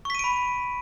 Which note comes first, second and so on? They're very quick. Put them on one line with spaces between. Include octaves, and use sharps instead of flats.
C#6 B6 D#7 D7 B5